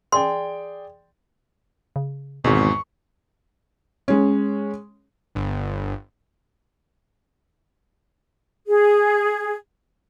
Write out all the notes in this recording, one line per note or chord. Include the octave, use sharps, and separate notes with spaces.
G#4 D5 G5 C6
C#3
G#1 E2 G#2 B2 C#6
G#3 C#4
G1
G#4